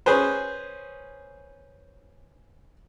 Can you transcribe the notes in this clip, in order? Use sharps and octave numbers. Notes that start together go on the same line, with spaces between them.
C#4 G#4 B4 C5